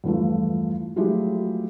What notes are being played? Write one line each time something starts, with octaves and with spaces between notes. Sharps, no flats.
E2 G2 F3 A3
F3 F#3 G#3 A3 E4 G4